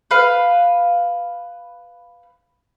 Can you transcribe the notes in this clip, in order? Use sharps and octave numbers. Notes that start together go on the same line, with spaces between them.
B4 F5